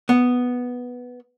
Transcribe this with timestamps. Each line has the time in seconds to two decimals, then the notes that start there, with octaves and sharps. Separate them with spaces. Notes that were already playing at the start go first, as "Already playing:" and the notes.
0.09 B3